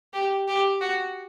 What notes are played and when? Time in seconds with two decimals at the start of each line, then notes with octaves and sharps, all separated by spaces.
0.14 G4
0.48 G4
0.81 F#4